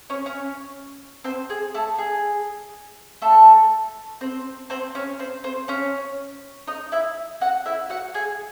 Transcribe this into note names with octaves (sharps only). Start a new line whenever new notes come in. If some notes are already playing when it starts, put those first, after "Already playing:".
C#4 C#5
C#4 C#5
C4 C5
G#4
A3 A4
G#4
A3 A4
C4 C5
C4 C5
C#4 C#5
C4 C5
C4 C5
C#4 C#5
D#4 D#5
E4 E5
F#4 F#5
E4 E5
F#4 F#5
G#4 G#5